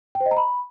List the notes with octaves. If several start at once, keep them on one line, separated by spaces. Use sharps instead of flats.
G5
C5
D#5
A#5
B5